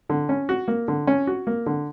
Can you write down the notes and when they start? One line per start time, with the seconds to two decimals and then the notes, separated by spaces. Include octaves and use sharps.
0.10 D3
0.29 C#4
0.49 F#4
0.68 A#3
0.88 D3
1.07 C#4
1.27 F#4
1.47 A#3
1.66 D3